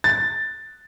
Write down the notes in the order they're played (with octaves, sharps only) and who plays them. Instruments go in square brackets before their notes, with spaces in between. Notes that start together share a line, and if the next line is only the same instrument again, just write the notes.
[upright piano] A6